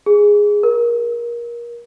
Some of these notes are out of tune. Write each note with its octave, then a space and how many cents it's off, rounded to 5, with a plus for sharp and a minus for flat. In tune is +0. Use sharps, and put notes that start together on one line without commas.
G#4 -5
A#4 +25